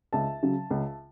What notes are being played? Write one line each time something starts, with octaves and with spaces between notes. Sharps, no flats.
C#2 E5 A5
C#3 F#3 C#4
C#2